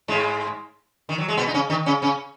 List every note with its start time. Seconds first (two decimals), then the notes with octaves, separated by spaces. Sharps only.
0.08 G#2 G#3
1.09 D#3
1.18 F#3
1.28 G#3
1.37 B2 B3
1.47 D#4
1.54 C#3 C#4
1.70 D#3 D#4
1.86 C#3 C#4
2.02 C#3 C#4